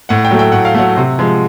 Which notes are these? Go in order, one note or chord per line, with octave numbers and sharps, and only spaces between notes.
A2 F#5
G5
F#3 A3
G5
A2 F#5
F5
F#3 A3 F#5
C3
F3 G#3